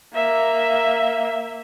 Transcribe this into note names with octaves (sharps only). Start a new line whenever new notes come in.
A#3 E5